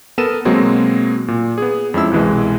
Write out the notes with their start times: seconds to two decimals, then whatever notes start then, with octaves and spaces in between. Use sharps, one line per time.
0.18 B3 A4 A#4 D#7 E7
0.45 B2 F#3 G#3 A#3 C4
1.28 A#2
1.58 B3 G#4
1.94 F2 G#3 C#4 E4 E6
2.11 C2 B2 E3 G#3